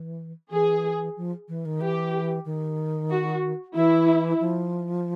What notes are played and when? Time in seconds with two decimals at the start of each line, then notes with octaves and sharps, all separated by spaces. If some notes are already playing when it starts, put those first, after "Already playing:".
Already playing: E3
0.51 E3 G#4
1.17 F3
1.48 E3
1.65 D#3
1.81 E3 G4
2.45 D#3
3.11 F#4
3.75 E3 E4
4.40 F3